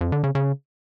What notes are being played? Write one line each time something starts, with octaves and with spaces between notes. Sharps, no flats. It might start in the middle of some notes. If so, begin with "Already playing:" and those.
F2
D3
C#3
C#3